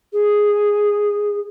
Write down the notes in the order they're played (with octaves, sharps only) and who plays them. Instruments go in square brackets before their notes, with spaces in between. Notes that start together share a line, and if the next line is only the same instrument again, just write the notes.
[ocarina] G#4